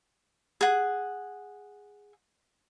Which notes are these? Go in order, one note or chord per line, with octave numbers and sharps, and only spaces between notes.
G#4 F#5